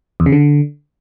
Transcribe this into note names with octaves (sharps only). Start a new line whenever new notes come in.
E2
C#3
D3